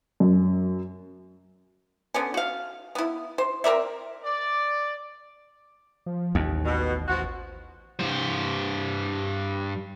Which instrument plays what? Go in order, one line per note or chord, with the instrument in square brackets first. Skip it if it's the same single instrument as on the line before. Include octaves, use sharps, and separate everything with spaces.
[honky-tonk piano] F#2
[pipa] D3 B3 C#4
F#4 F5
B3 E4
C5
C4 A#4 D5 E5
[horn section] D5
[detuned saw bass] F3
[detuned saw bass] A1 [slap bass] D#2
[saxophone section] B2
[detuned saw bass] A1 [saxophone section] F3 F4 F#4
[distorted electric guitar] G2 C5